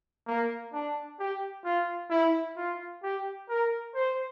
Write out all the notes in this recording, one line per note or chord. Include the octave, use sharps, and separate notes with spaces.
A#3
D4
G4
F4
E4
F4
G4
A#4
C5